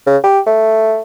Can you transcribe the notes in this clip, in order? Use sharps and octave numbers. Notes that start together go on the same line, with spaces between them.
C#3
G4
A3